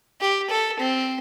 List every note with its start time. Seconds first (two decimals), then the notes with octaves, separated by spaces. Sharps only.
0.21 G4
0.50 A4
0.79 C4